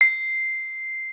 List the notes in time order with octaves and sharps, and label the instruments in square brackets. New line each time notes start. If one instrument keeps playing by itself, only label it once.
[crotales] C7